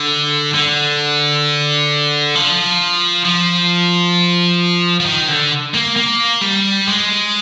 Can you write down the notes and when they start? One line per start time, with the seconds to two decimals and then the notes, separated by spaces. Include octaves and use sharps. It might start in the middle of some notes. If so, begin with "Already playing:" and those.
Already playing: D3
0.54 D3
2.35 F3
3.25 F3
5.00 F3
5.06 D#3
5.28 D3
5.74 A#3
5.96 A#3
6.41 G3
6.87 G#3